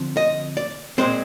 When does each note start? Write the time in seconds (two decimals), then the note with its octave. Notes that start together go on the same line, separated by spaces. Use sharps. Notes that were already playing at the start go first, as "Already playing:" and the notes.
Already playing: D3 F3 C4
0.17 D#5
0.57 D5
0.98 A#2 G#3 C4 C5